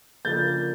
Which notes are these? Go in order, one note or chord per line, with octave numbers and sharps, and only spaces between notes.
C#3 F3 A#3 D4 G6 A6